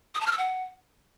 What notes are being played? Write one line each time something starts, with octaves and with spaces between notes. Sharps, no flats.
D#6
A5
F6
E6
F#5